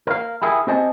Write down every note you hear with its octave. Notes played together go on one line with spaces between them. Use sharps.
A#4 F5
E4 G4 G#4 A#4
C4 G4 C5 D#5 G#5 A5